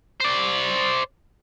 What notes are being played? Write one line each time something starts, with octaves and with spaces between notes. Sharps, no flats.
C5 D5